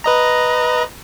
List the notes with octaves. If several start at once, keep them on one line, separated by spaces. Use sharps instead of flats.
B4 D#5 A#5